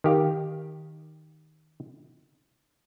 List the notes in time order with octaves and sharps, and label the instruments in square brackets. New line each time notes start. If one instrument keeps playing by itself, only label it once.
[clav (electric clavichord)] D#3 G4 F5